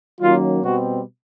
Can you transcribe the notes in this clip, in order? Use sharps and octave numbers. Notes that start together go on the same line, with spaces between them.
D#3 F#3 A#3 C#4 F4
B2 G3 C4 F#4